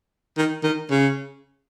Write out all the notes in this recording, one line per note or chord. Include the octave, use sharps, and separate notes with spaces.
D#3
D#3
C#3